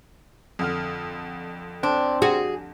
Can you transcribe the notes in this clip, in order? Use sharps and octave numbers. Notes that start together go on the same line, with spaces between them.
F2 D3 F6
C4 D4
F#4 G#4